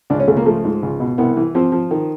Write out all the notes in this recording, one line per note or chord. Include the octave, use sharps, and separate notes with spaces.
C#2 D4
C#4
C#2 A3
A#3
F3 A3
G#2
C#2
B2
C2 B3
E3
F3 C4
F3
D#3